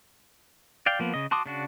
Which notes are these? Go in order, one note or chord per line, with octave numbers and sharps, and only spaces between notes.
D5 F5 G5
F3 A#3 B3
C#3 D#5
F#4 A5 C6 D6 D#6
C#3 D4 F#4